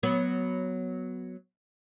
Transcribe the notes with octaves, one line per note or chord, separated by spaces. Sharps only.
F#3 B3